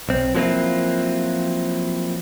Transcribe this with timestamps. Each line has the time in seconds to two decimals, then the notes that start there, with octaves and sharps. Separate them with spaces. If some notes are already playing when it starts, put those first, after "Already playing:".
0.09 B1 C4
0.35 F3 F#3 A#3 C4 E4 F4